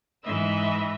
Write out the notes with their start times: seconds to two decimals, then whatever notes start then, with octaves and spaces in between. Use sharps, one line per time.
0.23 G#2 E3 B4 D#5 E5 E6